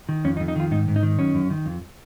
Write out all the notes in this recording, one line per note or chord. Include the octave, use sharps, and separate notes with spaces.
D#3
F2 C#4
D#4
F2
D#4
D#3 F4
G#2 D#4
G#2
D#4
D#3
F#2 C#4
F#2
D#3
F2